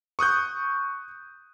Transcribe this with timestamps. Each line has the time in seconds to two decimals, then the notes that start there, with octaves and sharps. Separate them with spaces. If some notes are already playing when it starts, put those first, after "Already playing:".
0.19 C#6 D#6 F#6 G6